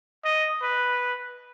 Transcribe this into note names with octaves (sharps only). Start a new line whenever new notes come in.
D#5
B4